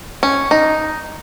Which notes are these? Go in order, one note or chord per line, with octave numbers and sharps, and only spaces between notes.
C#4
D#4